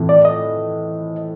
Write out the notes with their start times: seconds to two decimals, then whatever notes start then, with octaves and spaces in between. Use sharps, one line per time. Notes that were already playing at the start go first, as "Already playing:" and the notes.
Already playing: A2 E3 A3 C4
0.09 D5
0.25 D#5